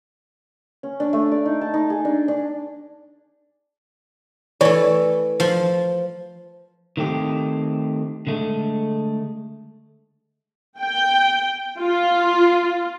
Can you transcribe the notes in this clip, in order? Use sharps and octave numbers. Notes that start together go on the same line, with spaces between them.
C#4
D4
A3
D5
D#4
A5
D#4
G#4
D4
D4
E3 A3 C#5 D5
F3
D#3 A3 C4 G4
D3 G#3 A3
G5
F4